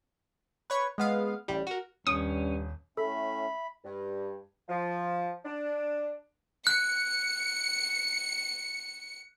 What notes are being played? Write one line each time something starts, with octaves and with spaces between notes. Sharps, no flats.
B4 C#5 C#6
G#3 B3 F5
A1 G3
F#4 A#4
D#1 G2 C#4 D#6
A2 A3 C#4 A4 E5 B5
G2
F3
D4
F#6 C#7